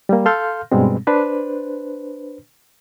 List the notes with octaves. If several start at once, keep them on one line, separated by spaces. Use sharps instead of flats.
G3 A#3
A4 F5 C6 F6 G6
G2 B2 G3 G#3 C4
D4 B4 C5